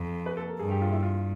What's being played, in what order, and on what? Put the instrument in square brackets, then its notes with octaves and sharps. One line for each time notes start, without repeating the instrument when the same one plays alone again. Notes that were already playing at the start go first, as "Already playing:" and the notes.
Already playing: [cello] F2
[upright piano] B4
A4
A#4
[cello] G2 [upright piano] G#4
[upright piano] G4
F4
E4
F4